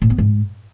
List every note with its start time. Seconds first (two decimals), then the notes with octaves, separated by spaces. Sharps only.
0.02 A2
0.10 B3
0.18 G#2